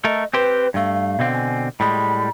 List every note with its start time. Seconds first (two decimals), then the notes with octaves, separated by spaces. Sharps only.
0.04 A3 A4 A#4 D#5
0.34 C4 G4 B4 C5
0.74 G2 A3 F5
1.19 B2 D3 C4
1.34 G#5
1.80 A2 G3 G#3 B5